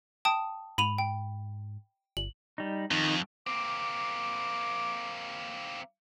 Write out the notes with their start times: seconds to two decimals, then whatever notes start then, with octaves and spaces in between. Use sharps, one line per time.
0.25 G5 A5 D#6
0.78 G#2 B5 D#7 F7
0.98 G5
2.17 G1 F#7
2.58 G3 D#4
2.91 F2 D#3
3.47 A#3 C4 D6